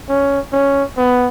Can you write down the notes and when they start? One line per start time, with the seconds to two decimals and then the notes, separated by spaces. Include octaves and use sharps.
0.09 C#4
0.53 C#4
0.97 B3